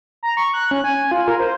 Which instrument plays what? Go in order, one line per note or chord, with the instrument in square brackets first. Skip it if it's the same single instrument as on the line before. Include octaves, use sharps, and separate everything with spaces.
[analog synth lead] A#5
C#6
F#6
C#4
G#5
F4
A#4
C5